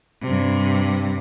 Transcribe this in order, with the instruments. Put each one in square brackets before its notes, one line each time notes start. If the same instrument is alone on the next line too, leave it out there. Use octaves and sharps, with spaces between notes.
[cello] G2 C3